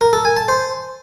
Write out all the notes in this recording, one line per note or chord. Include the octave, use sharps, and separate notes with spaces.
A#4
A4
G#5
A5
C5